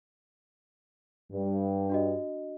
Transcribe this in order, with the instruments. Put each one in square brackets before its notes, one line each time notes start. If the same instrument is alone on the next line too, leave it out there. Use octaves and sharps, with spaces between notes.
[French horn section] G2
[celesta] D4 F#4 D#5